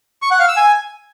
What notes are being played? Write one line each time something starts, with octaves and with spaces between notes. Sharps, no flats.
C#6
F#5
F5
E6
G#5